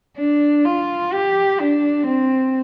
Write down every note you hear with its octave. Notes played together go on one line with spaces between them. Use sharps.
D4
F4
G4
D4
C4